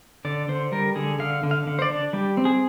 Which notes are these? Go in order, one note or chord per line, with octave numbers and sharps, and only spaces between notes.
D3 D5
D3 C5
G3 A#4
D3 G#4
D3 F5
D3
F5
D3
C5
D5
D4
G3 G4
C4
G#4